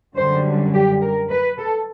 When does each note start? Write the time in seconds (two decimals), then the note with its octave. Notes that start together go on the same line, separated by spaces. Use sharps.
0.16 F#2 D3 G3 C5
0.74 G4
1.01 A#4
1.30 B4
1.58 A4